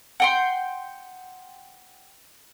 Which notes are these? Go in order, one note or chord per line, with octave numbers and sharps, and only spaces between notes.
F#5 G5 C6